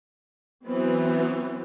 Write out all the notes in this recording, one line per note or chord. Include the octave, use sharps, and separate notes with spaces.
E3 F#3 B3 C4